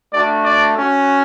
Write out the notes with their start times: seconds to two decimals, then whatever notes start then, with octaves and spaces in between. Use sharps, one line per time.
0.14 A3 D4 F#4 D5
0.45 D5
0.76 C#4 F#4